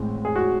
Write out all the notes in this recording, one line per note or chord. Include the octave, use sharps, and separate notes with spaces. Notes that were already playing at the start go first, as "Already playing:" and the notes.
Already playing: A1 A2 G#3 C4
G#4
F#4